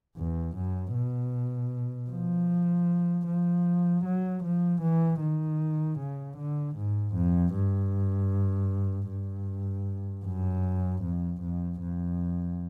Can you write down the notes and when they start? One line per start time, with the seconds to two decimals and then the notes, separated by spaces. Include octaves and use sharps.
0.17 E2
0.56 F#2
0.94 B2
2.10 F3
3.27 F3
4.05 F#3
4.44 F3
4.82 E3
5.20 D#3
5.99 C#3
6.37 D3
6.76 G#2
7.14 F2
7.54 G2
9.09 G2
10.25 F#2
11.03 F2
11.42 F2
11.80 F2